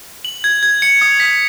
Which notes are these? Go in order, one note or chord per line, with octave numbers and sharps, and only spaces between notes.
F#7
G#6
G#6
C#7
D#6
B6